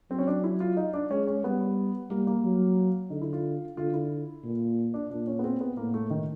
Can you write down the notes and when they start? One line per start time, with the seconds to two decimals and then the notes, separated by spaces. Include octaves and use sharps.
0.10 F#3 C4
0.18 C#4
0.27 D4
0.44 E4
0.60 F4
0.77 D#4
0.93 D4
1.10 G#3 C#4
1.27 C#4
1.44 G3 B3
2.10 G3 A#3
2.27 A#3
2.44 F#3
3.10 D3 D#4
3.22 E4
3.33 F4
3.77 D3 F4
3.94 E4
4.44 A#2
4.94 D4
5.10 A#2 D4
5.27 C#4
5.39 B3
5.44 C4
5.61 B3
5.77 A2 A#3
5.94 A3
6.10 D#3